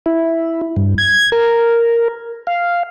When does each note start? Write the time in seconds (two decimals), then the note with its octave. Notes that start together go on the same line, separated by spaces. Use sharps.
0.06 E4
0.76 G2
0.98 G#6
1.32 A#4
2.47 F5